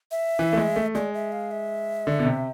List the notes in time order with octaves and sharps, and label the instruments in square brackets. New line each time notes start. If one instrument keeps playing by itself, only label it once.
[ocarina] E5
[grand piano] E3
A3
G#3
A3
[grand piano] G#3 [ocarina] D5
[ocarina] E5
F5
E5
[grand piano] D3
B2
C3